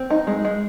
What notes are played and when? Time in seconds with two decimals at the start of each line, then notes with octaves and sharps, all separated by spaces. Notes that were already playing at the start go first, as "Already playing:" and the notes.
Already playing: C4
0.10 D#4
0.27 G#3
0.45 G#3